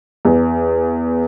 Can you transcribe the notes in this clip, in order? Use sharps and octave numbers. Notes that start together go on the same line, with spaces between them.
E2